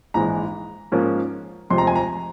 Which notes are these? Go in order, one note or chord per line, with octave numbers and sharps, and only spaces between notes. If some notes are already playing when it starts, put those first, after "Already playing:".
A#1 G#2 E3 G#3 A#5
G#2 F3 A#3 C#4
F1 F2 C3 F3 G#3 C6
A#5
G#5
A#5